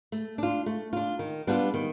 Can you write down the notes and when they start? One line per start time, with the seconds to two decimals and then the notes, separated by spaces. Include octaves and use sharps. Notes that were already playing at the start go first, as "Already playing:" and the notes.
0.12 A3
0.38 D4 F4
0.66 A3
0.93 D4 F4
1.19 D#3
1.47 G3 B3 D4 F4
1.74 D#3